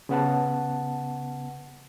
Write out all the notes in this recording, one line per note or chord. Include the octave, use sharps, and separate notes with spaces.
C#3 B3 F#5 A5